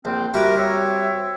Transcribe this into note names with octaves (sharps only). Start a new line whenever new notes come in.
A#1 C4
G3 E4 F#4 G4 A#4
C4 C#5 E5